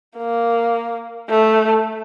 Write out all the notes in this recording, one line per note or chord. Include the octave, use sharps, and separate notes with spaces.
A#3
A3